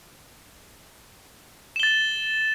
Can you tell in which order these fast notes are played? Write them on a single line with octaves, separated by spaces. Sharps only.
E7 G7 A6